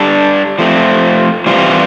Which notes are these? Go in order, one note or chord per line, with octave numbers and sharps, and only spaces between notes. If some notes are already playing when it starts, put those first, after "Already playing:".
Already playing: G3 D4 A4
F3 A3 C4
E3 G3 C4 F4